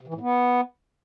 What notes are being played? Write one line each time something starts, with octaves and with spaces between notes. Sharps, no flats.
C3
E3
A2
B3